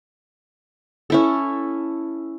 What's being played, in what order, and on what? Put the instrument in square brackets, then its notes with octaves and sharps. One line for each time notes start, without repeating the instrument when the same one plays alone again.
[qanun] C#4 E4 A4